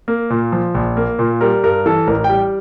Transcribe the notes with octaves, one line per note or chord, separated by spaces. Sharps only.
A#3
A#2
F3
A#1
A#3
A#2
G3 A#4
G2 A#4
E3 A4
A1 A#4
G3 G5